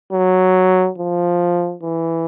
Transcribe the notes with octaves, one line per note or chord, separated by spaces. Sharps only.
F#3
F3
E3